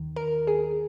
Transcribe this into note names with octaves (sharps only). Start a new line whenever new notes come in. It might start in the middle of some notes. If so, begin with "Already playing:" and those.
Already playing: D#2 D#3
A#4
G#4